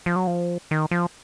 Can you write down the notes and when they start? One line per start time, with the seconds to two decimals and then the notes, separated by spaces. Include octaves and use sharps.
0.06 F3
0.16 F#3
0.27 F3
0.71 D#3
0.91 F3